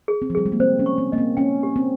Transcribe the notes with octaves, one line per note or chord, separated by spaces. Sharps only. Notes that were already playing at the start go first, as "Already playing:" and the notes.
G#4
C4
F3
G3 G#4
G#3
A#3
C4 C5
C#4
C#6
C4
A#3 D#5
C4
C#4 G5
G4
C4